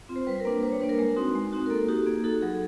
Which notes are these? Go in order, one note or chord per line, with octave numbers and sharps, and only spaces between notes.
C4 F4
C5
G3 B4
A#4
A#3 D4 B4
G3 C5
C#5
A#3 D4 B4
A#4
G#3
C4 D#4 F#4
G#3
C4 D#4 F#4
A#4
A#3 A4
D#4 F#4 G4
A#3 G#4
D#4 F#4 A4
F#3 G#4